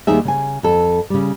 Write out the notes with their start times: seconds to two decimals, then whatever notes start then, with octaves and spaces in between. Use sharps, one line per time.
0.07 D#2 D#3 G3 D#4 G#4 E5
0.25 C#3 G#5
0.63 F2 A4
1.10 C#3 G3